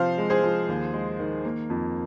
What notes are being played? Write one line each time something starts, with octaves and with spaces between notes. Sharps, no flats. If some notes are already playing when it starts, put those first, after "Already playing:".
Already playing: C3 F3 C5 F5
G#3
G#4 C5
F3
D#2
G#3
D#3
A#3
F2